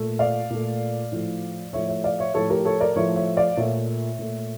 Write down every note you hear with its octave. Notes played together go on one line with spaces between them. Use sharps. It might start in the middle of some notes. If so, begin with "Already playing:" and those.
Already playing: A#2 A3
D5 F5
A#2 A3
A2 F3 A3
A2 F3 A3 C#5 E5
C#5 E5
D5 F5
C#5 E5
A2 F3 A3 A4 C#5
G4 A#4
A4 C#5
A#4 D5
A2 F3 A3 C#5 E5
C#5 E5
D5 F5
A#2 A3 C#5 E5
A#2 A3